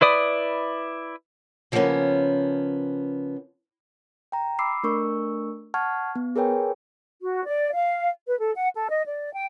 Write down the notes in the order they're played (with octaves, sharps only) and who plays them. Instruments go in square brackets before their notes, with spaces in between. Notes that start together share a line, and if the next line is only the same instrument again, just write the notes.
[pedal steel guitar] E4 B4 D5 D#6
[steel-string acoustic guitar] C#3 F3 G3 A#3 B3 C#4
[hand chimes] G5 A#5
B5 D6 E6 C7
A3 D4 A#4 C#6 E6
F#5 A5 C#6 F6 G#6
B3
G#4 A#4 B4 C#5 G5 G#5
[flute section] F#4
D5
F5
B4
A4
F#5
A4
D#5
D5
G5